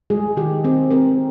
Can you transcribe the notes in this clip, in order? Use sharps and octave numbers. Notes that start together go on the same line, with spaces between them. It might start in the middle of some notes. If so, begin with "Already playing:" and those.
G#3 G#4
D#3 G4
C4 G#4
C4 A#4